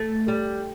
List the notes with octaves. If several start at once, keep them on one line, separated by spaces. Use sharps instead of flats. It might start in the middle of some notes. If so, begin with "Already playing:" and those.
Already playing: A3
G3